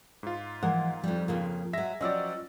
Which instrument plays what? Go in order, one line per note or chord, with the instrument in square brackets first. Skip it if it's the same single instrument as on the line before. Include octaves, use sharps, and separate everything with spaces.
[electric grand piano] G#2 F4
[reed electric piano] E3 F3 [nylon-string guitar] G#3 A#3 F#5
[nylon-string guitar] F2 G3 [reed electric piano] F3
[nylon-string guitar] F2 C#3 A#3
[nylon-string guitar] F#3 G#3 [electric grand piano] E5 A#6
[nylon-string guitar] F3 F#3 G4 [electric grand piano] C#4 D5 [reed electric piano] D#5 E6